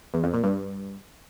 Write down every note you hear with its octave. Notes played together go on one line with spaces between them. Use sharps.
E2
F2
A#2
G2